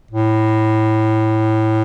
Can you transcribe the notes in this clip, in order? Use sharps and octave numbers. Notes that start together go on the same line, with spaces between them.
A2